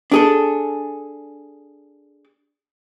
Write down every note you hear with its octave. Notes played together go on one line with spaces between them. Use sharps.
D4 G#4 A4